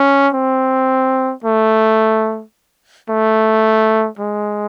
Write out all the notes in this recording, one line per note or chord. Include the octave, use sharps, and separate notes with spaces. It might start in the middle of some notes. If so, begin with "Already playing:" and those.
Already playing: C#4
C4
A3
A3
G#3